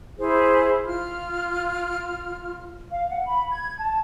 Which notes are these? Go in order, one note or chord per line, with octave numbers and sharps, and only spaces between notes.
E4 G#4 C5
F4 F6
F5
F#5
B5
G#6
A5